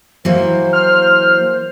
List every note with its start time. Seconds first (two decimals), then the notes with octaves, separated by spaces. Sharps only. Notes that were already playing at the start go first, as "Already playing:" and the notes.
0.25 E3 F#3 A#3 C5
0.73 F6